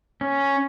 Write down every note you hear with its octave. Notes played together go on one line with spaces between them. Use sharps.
C#4